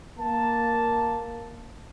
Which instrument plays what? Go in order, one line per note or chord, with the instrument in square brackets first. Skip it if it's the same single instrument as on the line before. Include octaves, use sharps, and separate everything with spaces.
[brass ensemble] A#3 A5